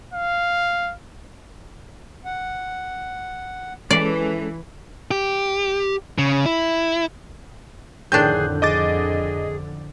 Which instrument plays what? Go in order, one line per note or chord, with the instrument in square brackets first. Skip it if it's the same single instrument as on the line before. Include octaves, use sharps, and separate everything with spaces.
[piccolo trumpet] F5
[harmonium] F#5
[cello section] E3 [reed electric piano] G#3 C#4 A4 [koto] D5
[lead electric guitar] G4
C#3
E4
[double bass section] F2 D3 [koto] A2 D#3 D4 [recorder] G#4 [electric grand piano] F#6 G6
[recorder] G#4 [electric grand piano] D#5 D6 A6